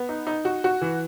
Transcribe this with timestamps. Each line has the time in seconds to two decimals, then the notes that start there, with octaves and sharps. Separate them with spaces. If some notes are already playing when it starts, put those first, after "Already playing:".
Already playing: B3
0.09 D#4
0.27 D#4
0.45 F#4
0.64 F#4
0.81 E3